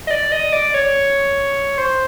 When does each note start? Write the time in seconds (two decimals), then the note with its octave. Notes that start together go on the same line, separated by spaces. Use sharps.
0.07 D#5
0.11 D5
0.32 D#5
0.53 D5
0.74 C#5
1.78 C5